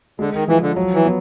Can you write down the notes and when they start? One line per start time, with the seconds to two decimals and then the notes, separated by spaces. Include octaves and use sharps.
0.19 D3 G#3
0.34 D#3
0.48 E3 F3
0.62 D3
0.76 F#3
0.94 E3
1.04 B3